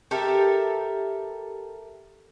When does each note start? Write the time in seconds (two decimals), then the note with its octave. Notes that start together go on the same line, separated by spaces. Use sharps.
0.11 G4 A4 A#4 E5